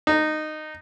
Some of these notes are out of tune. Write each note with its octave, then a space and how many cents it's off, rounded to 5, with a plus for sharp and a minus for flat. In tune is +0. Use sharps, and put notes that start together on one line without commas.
D#4 -15